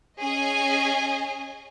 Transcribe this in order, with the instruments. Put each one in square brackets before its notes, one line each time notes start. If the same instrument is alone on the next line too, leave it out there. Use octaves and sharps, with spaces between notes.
[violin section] C#4 G#4 D#5 G#5